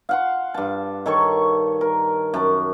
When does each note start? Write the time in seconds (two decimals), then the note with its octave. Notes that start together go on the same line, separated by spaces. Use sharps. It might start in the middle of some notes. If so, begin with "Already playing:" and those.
0.09 F5 F#5 C6
0.54 G2 A5
1.06 D#3 A4 C#5 C#6
1.81 A#4
2.34 F#2 A5